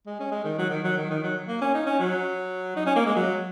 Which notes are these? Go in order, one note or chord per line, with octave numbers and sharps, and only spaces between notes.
G#3
C#4
G#3
D#3
F#3
D#3
F#3
D#3
D#3
F#3
A#3
C#4
D#4
C#4
F#3
D#4
C#4
A#3
G#3
F#3